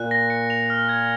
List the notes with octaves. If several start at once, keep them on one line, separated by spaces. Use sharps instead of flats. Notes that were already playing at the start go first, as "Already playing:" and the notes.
Already playing: A#2 F#6
A#6
C#7
F7
F6
G#6